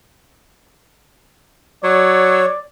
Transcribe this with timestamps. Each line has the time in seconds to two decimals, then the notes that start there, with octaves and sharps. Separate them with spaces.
1.84 F#3 C#5 D5